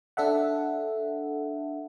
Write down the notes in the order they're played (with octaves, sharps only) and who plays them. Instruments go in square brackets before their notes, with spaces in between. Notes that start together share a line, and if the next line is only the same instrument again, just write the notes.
[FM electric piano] D4 A4 E5 F#5